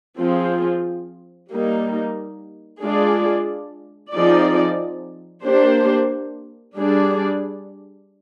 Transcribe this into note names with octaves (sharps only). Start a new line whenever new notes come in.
F3 C4 F4 G#4
G3 A#3 D#4
G#3 D4 F4 G#4 D5
F3 C4 D#4 G#4 D5
A#3 D4 G4 C5
G3 D4 G#4 D5